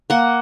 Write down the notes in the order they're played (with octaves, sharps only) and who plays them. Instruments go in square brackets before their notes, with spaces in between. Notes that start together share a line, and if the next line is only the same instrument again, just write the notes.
[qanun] A#3 F#5